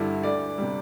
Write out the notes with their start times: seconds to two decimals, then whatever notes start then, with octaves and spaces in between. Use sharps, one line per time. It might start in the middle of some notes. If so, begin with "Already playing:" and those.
Already playing: G2 D3 G3 E4 G4
0.23 D2 D5
0.58 C3 G3